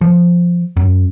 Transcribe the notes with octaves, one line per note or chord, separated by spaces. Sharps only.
F3
F#2